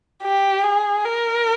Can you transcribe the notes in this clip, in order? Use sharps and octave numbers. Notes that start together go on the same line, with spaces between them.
G4
G#4
A#4